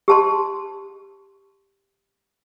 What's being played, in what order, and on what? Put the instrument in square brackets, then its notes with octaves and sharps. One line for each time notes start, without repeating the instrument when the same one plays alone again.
[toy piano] G4 A5 C6